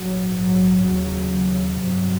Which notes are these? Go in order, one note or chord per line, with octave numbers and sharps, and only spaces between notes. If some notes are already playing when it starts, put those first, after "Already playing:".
Already playing: A#1 G#2 F#3
F#3
F1 D#2 C#3 F#3
F#3
G1 F2 C3 F#3